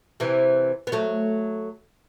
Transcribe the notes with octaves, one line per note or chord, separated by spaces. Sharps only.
C3 E3
B3
F#3 A3